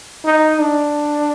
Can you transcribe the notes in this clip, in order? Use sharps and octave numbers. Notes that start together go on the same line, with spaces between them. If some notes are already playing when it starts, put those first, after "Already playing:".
D#4
D4